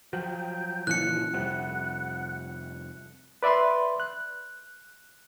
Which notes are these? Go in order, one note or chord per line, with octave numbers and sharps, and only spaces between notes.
F3 F#3 G5
A#2 C#3 E3 F3 F#6 C#7
F2 C3 G3 F#5
B4 D5 E5 B5 C6
F#6